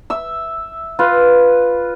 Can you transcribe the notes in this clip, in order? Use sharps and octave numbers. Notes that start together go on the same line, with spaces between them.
E5 E6
F4 B4